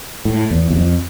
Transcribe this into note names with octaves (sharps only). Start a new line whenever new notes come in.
A2
E2
E2
F2